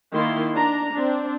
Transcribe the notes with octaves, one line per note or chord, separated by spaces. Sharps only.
D#3 A#3 E4 C6
D4 A#5
C4 D4